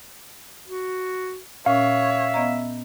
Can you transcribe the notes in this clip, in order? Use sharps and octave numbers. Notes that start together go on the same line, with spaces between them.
F#4
A#2 C#4 C#5 E5 F5
B3 D#5 A#5